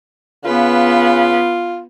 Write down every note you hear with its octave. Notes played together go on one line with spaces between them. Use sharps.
C#3 B3 F4 B4